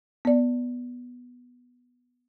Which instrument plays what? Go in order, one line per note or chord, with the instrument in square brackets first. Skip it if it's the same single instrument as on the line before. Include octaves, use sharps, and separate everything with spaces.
[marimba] B3 D5